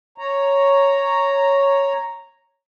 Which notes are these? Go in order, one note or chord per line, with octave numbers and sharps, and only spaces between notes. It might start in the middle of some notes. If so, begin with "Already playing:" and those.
C#5 A#5